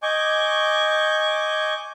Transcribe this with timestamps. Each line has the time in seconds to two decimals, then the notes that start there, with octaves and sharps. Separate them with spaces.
0.03 D#5 G#5 C#6 D6 G6